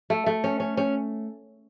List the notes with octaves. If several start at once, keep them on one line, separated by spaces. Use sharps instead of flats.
A3
A3
C#4
C#4
C#4